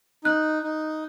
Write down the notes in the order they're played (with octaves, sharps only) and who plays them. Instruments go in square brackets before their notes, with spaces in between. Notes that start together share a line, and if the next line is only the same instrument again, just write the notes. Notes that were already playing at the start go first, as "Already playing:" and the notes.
[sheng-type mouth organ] D#4 [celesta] F#6
[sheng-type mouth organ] D#4